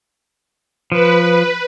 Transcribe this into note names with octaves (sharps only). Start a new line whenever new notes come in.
F3 B4